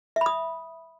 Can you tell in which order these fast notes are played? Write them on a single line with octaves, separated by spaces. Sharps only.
E5 B5 D#6